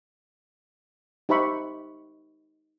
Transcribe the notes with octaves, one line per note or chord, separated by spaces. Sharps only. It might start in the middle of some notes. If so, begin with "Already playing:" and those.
D#4 G4 C5 E5 B5 C#6